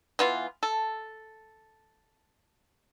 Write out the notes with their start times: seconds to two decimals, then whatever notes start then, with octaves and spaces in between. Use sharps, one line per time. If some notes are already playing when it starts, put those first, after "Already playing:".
0.19 E3 B3 F4
0.63 A4